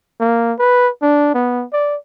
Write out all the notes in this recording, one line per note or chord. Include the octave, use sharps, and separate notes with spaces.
A#3
B4
D4
B3
D5